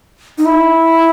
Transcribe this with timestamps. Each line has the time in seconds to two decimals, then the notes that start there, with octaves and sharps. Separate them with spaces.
0.38 D#4
0.45 E4